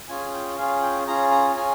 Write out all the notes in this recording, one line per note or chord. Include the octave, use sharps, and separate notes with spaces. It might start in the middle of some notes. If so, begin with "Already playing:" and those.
C#4 F4 G#4 G#5
G5
C#4 F4 G#4 F5
G5
C#4 F4 G#4 A#5
A#5
C#4 F4 G#4 G#5